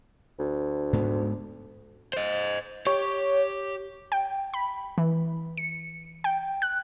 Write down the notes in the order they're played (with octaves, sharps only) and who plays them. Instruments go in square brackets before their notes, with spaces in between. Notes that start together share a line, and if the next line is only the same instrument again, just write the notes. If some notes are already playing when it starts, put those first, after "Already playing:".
[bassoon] D2
[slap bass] G#2 G#3 B3
[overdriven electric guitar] C5 D#5
[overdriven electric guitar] G4 [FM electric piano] C#5
[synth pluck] G5
B5
E3
C#7
G5
F#6